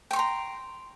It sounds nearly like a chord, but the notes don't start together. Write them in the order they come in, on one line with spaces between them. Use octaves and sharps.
G5 C#6 C6 A#5